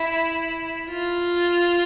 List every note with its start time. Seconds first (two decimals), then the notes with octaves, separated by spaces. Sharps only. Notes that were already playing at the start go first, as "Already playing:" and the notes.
Already playing: E4
0.90 F4